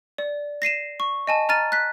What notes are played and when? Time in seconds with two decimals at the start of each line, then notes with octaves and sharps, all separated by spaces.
0.18 D5
0.62 A#6 C7 D#7 E7
1.00 C#6
1.27 D#5 G#5 A5
1.49 A#5 F6 A6 D#7
1.72 F#6 B6